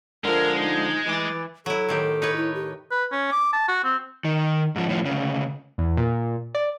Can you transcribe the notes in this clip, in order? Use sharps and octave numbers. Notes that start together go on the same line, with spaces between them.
D3 F3 G#3 A#4
D#4
E3 D6 A6
F#3 E4 A4
A2 D#3 G4
D#4 B4 C#5
E4
G4
B4
C#4
D6
A5
F#4
C4
D#3
G#2 F3
A2 F3
D2 C#3
E2
A#2
D5